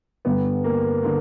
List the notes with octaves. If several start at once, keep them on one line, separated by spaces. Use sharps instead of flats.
G2 D3 G3 B3
A#3
D3 A#3